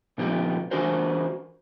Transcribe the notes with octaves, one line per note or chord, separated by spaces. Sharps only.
A#2 D3 F3 B3 D#4 G4
E3 D4 F#4 G#4 A#4 C5